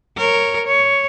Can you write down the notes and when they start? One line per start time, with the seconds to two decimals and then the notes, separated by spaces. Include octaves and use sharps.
0.17 A#4 C#5
0.66 C#5